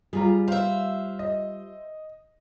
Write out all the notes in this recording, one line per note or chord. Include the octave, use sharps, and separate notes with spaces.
G3 F4 G#4 A#5
C5 E5 F5
D#5